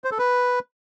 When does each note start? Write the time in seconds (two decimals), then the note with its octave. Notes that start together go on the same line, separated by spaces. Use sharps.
0.04 C5
0.11 A4
0.19 B4